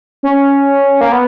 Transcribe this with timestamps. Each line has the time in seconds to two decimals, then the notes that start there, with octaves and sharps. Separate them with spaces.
0.23 C#4
1.01 A#3
1.12 B3